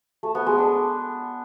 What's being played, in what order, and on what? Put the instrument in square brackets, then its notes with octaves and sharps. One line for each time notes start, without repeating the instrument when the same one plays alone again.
[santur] A3
B3
G#3
D4